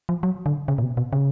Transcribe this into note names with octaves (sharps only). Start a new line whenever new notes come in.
F3
F#3
D3
C#3
A#2
B2
B2
C#3